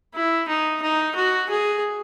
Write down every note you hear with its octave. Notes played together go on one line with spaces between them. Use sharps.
E4
D#4
D#4
F#4
G#4